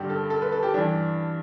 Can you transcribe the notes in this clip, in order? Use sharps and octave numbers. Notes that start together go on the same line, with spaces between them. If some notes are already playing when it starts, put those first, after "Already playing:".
Already playing: G2 D3 G4
A4
A4
B4
A4
G4
G2 E3 D4